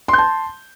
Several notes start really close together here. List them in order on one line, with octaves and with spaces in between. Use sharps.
C6 G6 A5